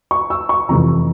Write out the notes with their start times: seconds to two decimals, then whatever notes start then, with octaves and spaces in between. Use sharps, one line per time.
0.11 C#6
0.30 E6
0.49 C#6
0.69 F2 C3 E3 A#5